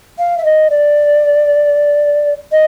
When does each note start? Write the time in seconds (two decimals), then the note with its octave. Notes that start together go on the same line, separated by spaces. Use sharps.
0.18 F5
0.37 E5
0.44 D#5
0.70 D5
2.51 D#5